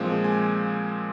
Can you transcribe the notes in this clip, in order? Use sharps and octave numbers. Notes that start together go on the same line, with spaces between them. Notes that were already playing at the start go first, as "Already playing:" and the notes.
Already playing: A#2 F3 G#3 C4
G#5